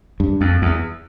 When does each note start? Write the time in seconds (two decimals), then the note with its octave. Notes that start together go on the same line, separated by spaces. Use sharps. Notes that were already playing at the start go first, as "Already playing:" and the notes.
0.20 G2
0.41 F2
0.62 E2